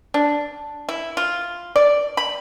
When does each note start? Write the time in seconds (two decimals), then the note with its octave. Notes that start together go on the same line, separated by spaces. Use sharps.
0.14 D4
0.89 E4
1.17 F4
1.76 D5
2.17 B5